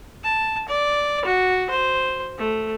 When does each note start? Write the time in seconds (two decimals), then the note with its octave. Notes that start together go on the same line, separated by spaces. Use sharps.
0.24 A5
0.68 D5
1.25 F#4
1.70 C5
2.38 A3